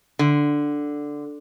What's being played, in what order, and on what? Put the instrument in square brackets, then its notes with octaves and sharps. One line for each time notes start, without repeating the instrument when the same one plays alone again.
[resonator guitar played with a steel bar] D3